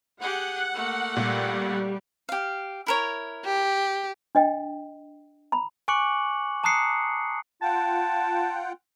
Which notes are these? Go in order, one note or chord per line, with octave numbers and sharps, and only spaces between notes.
G4 G#4 F#5
A3 A#3
A#2 G3
G4 F5
E4 A#4 C#5
G4
D4 D#5 G5
A#5 B5
G#5 C#6 D6 F#6 C#7 F#7
A5 A#5 D#6 F#6 C7 C#7
F4 F#5 G5 A5